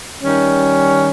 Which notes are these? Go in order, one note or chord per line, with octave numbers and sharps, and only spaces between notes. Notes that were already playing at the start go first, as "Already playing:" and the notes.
D#3 G3 C#4